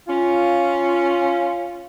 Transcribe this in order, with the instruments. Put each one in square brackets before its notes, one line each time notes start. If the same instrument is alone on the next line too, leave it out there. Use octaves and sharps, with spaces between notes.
[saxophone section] C#4 F4